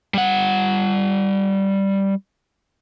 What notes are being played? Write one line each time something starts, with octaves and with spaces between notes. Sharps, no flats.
G3 F#5